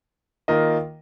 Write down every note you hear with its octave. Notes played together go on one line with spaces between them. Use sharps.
D#3 A#3 F4 A#4 D#5